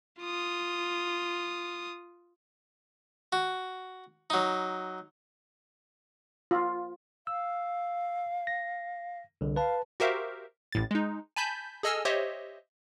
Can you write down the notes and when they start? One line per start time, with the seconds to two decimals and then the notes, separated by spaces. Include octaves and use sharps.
0.20 F4 D#6
3.32 F#4
4.30 F#3 D#4
6.51 F4
7.27 F5 E6
8.47 A#6
9.41 C2 D3
9.56 B4 F5 A5
10.00 F#4 G4 A#4 C5 E5 F5
10.72 A1 A2 A6
10.91 G#3 D#4
11.36 G#5 A5 B5 G6 B6
11.83 G#4 A4 D#5 G#5 E6 F6
12.05 G4 C5 C#5 D#5 E5